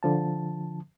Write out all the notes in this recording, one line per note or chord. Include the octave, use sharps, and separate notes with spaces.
D3 F3 A5